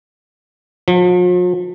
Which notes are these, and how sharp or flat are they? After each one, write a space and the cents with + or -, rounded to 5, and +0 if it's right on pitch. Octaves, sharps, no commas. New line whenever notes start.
F3 +45